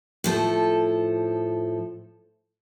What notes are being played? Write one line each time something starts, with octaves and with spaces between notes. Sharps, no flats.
A2 F3 A4